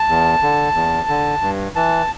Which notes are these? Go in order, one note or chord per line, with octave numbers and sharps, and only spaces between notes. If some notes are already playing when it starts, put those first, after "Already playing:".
Already playing: A5
E2
D3
E2
D3
G2
E3 A5